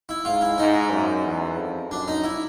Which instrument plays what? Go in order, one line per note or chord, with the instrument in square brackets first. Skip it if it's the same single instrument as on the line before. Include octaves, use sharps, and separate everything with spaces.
[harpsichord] E4
[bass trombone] G#2 [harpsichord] F4
[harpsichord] E4
[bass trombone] G#2 [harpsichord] D#4
[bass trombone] F#2
E2
F2
[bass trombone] F#2 [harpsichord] D4
[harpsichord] D#4
E4